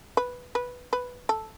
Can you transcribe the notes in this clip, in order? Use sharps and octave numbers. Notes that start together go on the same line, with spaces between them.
B4
B4
B4
A4